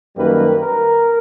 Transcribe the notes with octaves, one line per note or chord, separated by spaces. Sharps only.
F#2 D#3 G3 A#3 B4
A#4